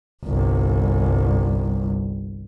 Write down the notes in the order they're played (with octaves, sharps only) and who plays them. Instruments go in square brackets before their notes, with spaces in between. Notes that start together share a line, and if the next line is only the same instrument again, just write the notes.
[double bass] G1 C2